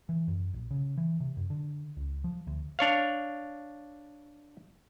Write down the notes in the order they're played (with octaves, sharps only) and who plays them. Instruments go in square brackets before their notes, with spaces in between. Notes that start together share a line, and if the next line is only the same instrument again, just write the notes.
[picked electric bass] E3
F#2
A#1
C#3
E3
C3
F#2
D3
C#2
F3
D2
[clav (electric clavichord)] D4 C#5 F5